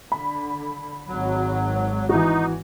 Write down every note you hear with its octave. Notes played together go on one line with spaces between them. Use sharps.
D3 B5
G#1 F#3
E3 D#4 F#4